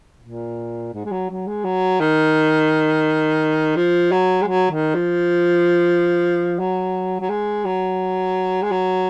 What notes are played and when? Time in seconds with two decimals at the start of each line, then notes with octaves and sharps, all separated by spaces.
0.23 A#2
0.94 G#2
1.05 G#3
1.12 F#3
1.30 F#3
1.47 G#3
1.64 F#3
2.00 D#3
3.76 F3
4.12 F#3
4.42 G#3
4.47 F#3
4.71 D#3
4.94 F3
6.59 F#3
7.20 F#3
7.30 G#3
7.65 F#3
8.63 G#3
8.71 F#3